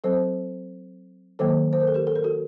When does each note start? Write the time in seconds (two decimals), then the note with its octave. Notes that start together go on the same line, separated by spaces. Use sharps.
0.04 F#3 C4 A4 C5
1.39 D#3 F#3 A#3 A4 C5
1.73 C5
1.80 A#4
1.87 A4
1.94 G4 A#4
2.07 A4
2.15 A#4
2.24 F#4 A4